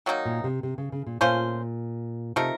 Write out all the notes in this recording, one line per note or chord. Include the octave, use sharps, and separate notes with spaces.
D#3 F#3 A#3 D#4
A#2
C3
C3
C#3
C#3
A#2
A#2 A3 C#4 F4 C5
C3 F3 A3 D#4 A#4